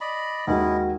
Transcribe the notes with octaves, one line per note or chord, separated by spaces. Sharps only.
D5 D#5 B5
D#2 G#3 C#4 E4 F#4 D#5 F#5